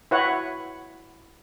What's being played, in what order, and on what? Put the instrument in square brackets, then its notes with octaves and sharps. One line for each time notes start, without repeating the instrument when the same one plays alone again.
[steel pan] E4 F#4 B4 C#5 F#5